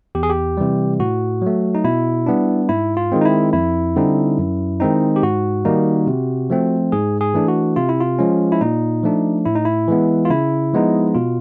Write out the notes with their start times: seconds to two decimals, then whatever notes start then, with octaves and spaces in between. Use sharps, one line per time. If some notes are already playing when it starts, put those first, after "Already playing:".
0.15 E2 G4
0.23 G#4
0.30 G4
0.57 C3 E3 G3
1.00 A2 F#4
1.42 F#3 A3
1.75 D#4
1.84 B2 E4
2.26 G3 B3 D4
2.69 G#2 E4
2.97 F4
3.12 D#3 G#3 C4
3.21 D#4
3.25 E4
3.53 F2 E4
3.96 D3 G3 C4 D#4
4.39 F#2
4.80 D#3 G#3 C4 D#4
5.16 G4
5.23 G#2 F#4
5.65 D#3 G3 A#3 D#4
6.07 C3
6.50 F3 A3 C4
6.92 G#2 G#4
7.21 G#4
7.34 E3 A3 D4
7.48 F#4
7.76 C3 F4
7.89 E4
8.00 F4
8.19 F3 G#3 C#4
8.52 E4
8.61 A#2 D#4
9.04 F3 A3 D4
9.46 A2 E4
9.55 D#4
9.65 E4
9.88 E3 G#3 B3
10.25 F4
10.30 C#3 E4
10.73 F3 G#3 B3 D#4
11.15 B2 F4